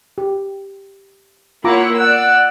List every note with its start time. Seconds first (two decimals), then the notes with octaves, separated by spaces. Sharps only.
0.18 G4
1.64 A#3 E4 F4 C#5 F#5 A#5 D6
1.98 D5 F#5 E6